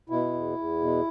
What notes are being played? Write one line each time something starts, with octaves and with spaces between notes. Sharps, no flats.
B2 E4
E2
E2
B2